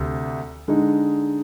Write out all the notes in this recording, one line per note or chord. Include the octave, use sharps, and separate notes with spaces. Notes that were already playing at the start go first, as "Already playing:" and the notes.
Already playing: D2 C3
D3 G#3 D#4